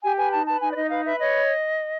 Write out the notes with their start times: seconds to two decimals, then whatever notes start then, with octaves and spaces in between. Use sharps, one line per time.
0.02 G4 G#5
0.17 B4 G#5
0.32 D#4 A5
0.47 B4 A5
0.61 D#4 G#5
0.72 D5
0.76 D#4 D#5
0.90 B4 F5
1.05 B4 E5
1.19 C#5 D#5